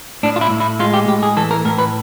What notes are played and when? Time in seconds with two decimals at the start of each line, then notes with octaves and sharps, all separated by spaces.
0.23 A2 D4
0.36 F4
0.41 E4
0.50 A2
0.60 E4
0.79 G#3 F4
0.93 G4
1.08 A2 G4
1.23 G#4
1.37 E3 A4
1.51 A#4
1.65 A2 A#4
1.78 B4